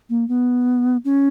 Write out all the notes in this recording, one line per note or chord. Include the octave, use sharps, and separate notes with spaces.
A#3
B3
C#4